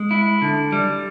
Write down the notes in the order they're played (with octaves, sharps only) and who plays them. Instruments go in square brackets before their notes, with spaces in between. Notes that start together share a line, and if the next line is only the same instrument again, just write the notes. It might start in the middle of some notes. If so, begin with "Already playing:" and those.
Already playing: [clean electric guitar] G#3
E4
D3
G3